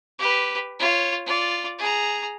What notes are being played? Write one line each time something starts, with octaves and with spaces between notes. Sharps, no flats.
G4 B4
F4 C#5
F4 D5
G#4 A#5